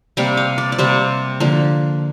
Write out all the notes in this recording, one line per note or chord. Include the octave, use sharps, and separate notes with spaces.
C3 G3 A#3 G5
F5
D5
D5
C3 G3 A#3 C5
D3 F3 A#3